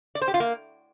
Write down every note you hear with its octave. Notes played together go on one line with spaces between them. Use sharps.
D5
C5
G4
F4
A#3